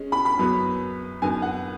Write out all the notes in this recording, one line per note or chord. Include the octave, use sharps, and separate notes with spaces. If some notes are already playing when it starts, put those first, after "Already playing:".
Already playing: G#3 C#4
B5
B5
F#2 F#3 B3
F#2 D#3 B3 G#5
F#5